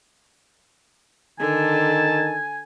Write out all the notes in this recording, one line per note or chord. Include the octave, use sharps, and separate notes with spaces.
D3 D#3 G#5 A5